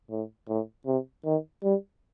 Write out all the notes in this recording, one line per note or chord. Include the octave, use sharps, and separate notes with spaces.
A2
A2
C3
D#3
G3